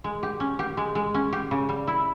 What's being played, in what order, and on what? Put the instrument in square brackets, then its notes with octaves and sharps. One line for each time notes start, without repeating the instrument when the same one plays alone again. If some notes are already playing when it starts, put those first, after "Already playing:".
[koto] G#3
G4
C#4
G4
G#3
G#3
C#4
G4
C#3
G3
E4